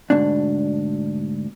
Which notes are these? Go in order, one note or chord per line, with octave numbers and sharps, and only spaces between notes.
D2 G#2 B2 D4